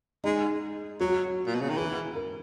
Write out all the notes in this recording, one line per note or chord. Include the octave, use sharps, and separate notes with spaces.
G#3 D#4
F#3 F#4
A#2
B2
C#3
D#3
E3 G#4
A#4